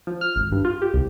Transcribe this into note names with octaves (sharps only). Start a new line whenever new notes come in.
F3
F6
G#1
G2
F4
G4
C2